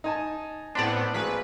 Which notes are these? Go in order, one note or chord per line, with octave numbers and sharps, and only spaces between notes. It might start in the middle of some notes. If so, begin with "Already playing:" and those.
D#4 G#5 A5
A2 B3 C4 D4 D5
G#1 A#3 G#4 B4